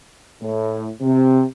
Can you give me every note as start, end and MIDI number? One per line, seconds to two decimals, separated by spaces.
0.42 0.91 45
1.01 1.44 48